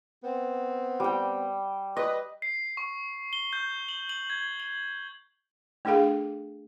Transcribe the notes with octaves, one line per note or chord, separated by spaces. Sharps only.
B3 C4
G3 G5
B4 D#5
C7
C#6
G7
G6
F#7
F#7
G#6
F#7
A3 D4 G#4 A4 F5